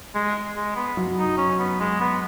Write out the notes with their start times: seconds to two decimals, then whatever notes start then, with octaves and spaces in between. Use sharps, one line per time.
0.15 G#3
0.56 G#3
0.76 B3
0.97 F#3
1.18 D#4
1.38 C#4
1.59 B3
1.80 G#3
2.00 B3